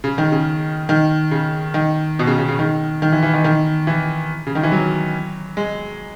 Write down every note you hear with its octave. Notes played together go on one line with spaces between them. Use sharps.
C#3
D#3
C#3
D#3
C#3
D#3
B2
C#3
C#3
C#3
D#3
D#3
E3
E3
D#3
D#3
E3
C#3
D#3
E3
F#3
G#3